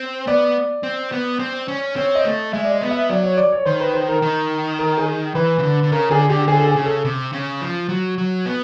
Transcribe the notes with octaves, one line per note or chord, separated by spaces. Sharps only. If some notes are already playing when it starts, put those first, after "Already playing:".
Already playing: C4
B3 D5
C4
B3
C4
C#4
C4 C#5
D#5
A3
G#3 E5
D5
D#5
B3
E5
F#3 D5
C#5
D5
C#5
D#3 C5
B4
C5
A#4
D#3
A#4
G#4
E3 B4
C#3
D3
D3
C#3 A#4
D3 G#4
D3 G4
D3 G#4
A4
G#4
C#3
A4
C3
C#3
F3
F#3
F#3
B3